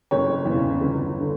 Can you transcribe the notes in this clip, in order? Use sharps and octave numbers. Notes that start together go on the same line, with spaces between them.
F#1 C#5
E2
C#3
G1
D3